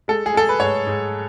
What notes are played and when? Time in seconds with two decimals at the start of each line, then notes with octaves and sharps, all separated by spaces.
0.08 G#3 A4
0.26 G#4
0.34 G#3 A4
0.49 B4
0.60 G#2 C#5
0.87 G#2